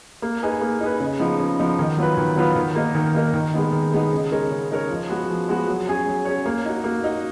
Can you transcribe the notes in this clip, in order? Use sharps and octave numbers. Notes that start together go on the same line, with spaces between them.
A#3
D#4 G#4 B4
A#3
D#4 G#4 B4
C#3
F3 B3 D#4
C#3
F3 B3 D#4
D#3
F#3 B3 F4 B4
D#3
F#3 B3 F4 B4
D#3
A#3 D#4 A#4
D#3
A#3 D#4 A#4
D#3
G#3 B3 D#4
D#3
G#3 B3 D#4
C#3
G#3 D#4 A#4 C#5
C#3
G#3 D#4 A#4 C#5
F3
G#3 B3 F#4
F3
G#3 B3 F#4
F#3
C#4 G#4 C#5
F#3
C#4 G#4 C#5
A#3
D#4 F#4
A#3
D#4 F#4